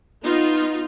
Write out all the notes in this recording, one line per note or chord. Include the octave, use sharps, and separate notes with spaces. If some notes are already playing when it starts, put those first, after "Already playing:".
B3 D#4 F4